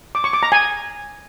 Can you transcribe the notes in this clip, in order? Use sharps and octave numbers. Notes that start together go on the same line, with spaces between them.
D6
C#6
D6
A#5
G#5